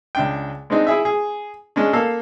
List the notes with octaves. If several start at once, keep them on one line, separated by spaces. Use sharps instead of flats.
C#2 D4 G5
G#3 C4 D4 D#4
E4 G#4 E5
G#4
G#3 C#4 D4
A#3 A4 F5